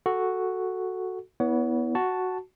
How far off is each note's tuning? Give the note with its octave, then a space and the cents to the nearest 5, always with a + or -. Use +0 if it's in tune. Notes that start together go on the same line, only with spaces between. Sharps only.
F#4 +0 A4 +0
B3 -10 E4 -20 C#5 +30
F#4 +0 A5 +0